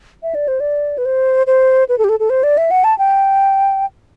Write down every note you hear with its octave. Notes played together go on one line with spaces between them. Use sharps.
E5
D5
C5
D5
B4
C5
C5
B4
A4
G4
A4
A4
C5
D5
E5
F#5
A5
G5